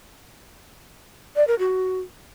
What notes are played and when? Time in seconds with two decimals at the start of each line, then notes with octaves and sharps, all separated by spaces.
1.36 D5
1.47 A#4
1.59 F#4